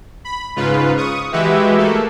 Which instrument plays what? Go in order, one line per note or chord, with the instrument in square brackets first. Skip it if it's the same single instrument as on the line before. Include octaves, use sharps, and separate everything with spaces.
[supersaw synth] B5
G#2 C#3 F4 B4
C#6 D#6
E3 G#3 F#4 G4 B4 E5
A3 A#3 A4